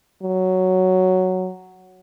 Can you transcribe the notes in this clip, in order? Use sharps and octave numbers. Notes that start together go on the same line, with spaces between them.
F#3